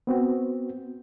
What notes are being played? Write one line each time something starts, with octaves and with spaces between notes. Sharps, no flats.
B3 C4 F#4